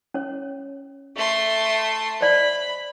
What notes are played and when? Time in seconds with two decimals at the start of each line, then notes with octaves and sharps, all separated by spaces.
0.14 C#4 C#5
1.16 A3 C6
2.21 C5 D5 B5